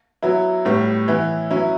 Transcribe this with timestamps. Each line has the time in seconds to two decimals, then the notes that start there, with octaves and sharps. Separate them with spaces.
0.23 F#3 B3 E4
0.65 A2 G3 B3
1.08 E3 B3 E4
1.51 F#3 C#4 E4